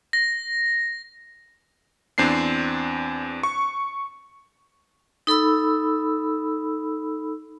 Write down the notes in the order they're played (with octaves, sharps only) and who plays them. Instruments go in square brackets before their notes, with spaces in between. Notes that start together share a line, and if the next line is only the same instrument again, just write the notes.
[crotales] A#6
[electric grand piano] E2 C4 D4 C7
C#6
[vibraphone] D#4 A4 B5 E6